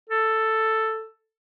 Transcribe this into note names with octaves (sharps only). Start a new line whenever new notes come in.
A4